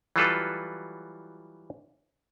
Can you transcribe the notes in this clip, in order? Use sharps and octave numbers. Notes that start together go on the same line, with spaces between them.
E3 F#3 G3 F4 A4 B4